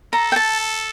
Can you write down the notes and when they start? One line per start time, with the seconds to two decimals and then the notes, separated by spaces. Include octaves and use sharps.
0.13 A4 A#5
0.32 G5
0.36 A5